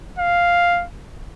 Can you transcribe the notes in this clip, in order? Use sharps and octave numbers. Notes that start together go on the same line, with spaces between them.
F5